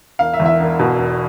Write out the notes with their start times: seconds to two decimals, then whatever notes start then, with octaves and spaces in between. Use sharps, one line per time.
0.19 E1 F5
0.34 E5
0.40 E2
0.46 E5
0.60 E1
0.79 B2
0.99 E1